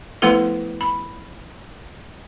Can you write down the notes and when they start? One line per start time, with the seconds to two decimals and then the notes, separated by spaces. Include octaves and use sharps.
0.22 F3 A3 B3 E4 A4 B4
0.81 B5